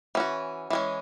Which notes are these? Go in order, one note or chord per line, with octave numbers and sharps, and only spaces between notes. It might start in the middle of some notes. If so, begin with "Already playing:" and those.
E3 C#4 F#4
E3 G#3 C#4